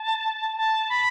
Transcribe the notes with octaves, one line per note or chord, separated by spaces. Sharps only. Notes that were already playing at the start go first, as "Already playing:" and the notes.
Already playing: A5
A5
B5